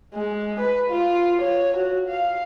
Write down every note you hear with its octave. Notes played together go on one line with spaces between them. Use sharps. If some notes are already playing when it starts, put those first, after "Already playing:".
G#3
B4
F4
C#5
F#4
F5